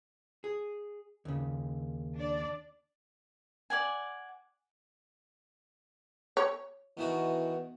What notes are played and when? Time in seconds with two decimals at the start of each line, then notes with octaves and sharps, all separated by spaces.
0.44 G#4
1.25 D#2 C#3
2.16 D4 D5
3.70 D5 F#5 G#5
6.37 C#5
6.97 B2 D#3 E3 F#4